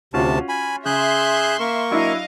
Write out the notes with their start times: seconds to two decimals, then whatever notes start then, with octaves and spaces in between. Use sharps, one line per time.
0.14 D2 C3 C#4 F4 F#4 A5
0.49 G#5 B5
0.86 C#3 G#4 E5 C6 F#6 G6
1.60 A#3 A#4 C#6
1.91 F#3 D4 E4 D#5 F5